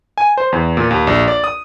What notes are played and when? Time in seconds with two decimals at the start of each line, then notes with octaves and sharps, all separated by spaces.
0.18 G#5
0.37 C5
0.52 E2
0.77 A#2
0.91 D#2
1.07 A#1
1.28 D5
1.44 D#6